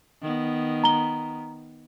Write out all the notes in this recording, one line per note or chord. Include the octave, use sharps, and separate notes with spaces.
D#3 B3
A#5 G7